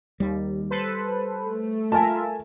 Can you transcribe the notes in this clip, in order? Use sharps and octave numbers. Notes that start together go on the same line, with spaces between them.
D#2 G3
A4 B4 C5
A3
F4 A#4 E5 G#5 A5